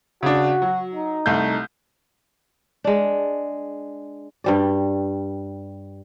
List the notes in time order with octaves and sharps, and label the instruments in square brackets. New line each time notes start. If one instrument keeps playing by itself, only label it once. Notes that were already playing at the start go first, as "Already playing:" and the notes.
[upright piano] C#3 D4 [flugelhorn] F#4
[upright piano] F#3
[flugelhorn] D#4
[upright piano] C2 A3 G6
[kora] G#3 D4
G2 G3 D5